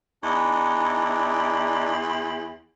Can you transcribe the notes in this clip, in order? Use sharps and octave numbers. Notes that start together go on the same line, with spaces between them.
E2 D4 D#4 D5